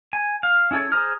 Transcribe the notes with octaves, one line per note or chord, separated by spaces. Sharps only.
G#5
F5
C#4 E4 G#4 A4 C#5
G#4 C5 A#5 D#6 F6